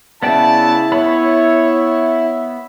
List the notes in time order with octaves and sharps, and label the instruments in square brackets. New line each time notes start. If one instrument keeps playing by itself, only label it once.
[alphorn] C#3 [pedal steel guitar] B3 D5 G5 [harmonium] E4 [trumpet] A5
[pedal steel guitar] B3 B5 [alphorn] C#5 [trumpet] E5